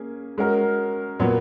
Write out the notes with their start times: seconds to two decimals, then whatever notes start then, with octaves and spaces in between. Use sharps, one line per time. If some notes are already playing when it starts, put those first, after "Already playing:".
Already playing: A#3 C#4 G#4
0.38 G#3 C#4 F#4 A#4
1.20 A#2 F#3 B3